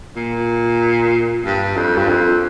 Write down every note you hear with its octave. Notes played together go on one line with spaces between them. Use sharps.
A#2
G2
F2
G2
F2